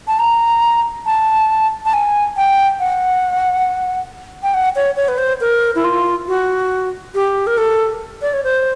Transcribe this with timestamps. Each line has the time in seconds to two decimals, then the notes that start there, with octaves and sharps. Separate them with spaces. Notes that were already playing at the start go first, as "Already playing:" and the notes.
0.08 A5
0.19 A#5
1.06 A5
1.86 A5
1.94 G#5
2.37 G5
2.80 F#5
4.43 G5
4.54 F#5
4.76 C#5
4.96 C#5
5.08 B4
5.18 C5
5.41 A#4
5.75 E4
5.84 F4
6.28 F#4
7.15 G4
7.47 A#4
7.58 A4
8.22 D5
8.33 C#5
8.44 C5